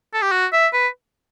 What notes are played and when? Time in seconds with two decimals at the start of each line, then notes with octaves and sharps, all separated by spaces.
0.14 A4
0.22 G4
0.32 F#4
0.53 E5
0.73 B4